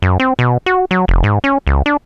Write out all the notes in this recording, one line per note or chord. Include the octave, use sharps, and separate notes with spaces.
F#2
C4
B2
F#4
F#3
F1
G#2
C#4
C#2
D4